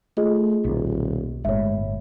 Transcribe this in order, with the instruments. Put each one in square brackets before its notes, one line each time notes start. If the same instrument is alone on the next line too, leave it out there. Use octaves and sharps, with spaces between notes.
[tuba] A3 [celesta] F4 G#4 D#5
[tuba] D#1 [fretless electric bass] B1
[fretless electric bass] G1 A2 [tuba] G#3 [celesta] C#5 E5